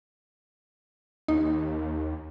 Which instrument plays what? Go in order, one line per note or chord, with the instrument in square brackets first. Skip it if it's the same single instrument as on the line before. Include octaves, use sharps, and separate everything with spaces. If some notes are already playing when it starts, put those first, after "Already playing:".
[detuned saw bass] D#2 [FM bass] D#4